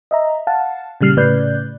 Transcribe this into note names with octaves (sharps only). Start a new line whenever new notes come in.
D#5 E5 A#5
F5 F#5 A5
A#2 C#3 G3 F6 C7
A2 C#3 B4 D5 F#6 G6